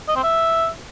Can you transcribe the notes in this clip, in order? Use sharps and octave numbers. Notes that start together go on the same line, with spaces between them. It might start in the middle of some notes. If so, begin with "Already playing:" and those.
D#5
C4
E5